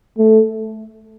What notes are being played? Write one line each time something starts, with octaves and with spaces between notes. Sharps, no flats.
A3